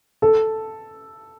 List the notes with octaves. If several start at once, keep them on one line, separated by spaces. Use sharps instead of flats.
A4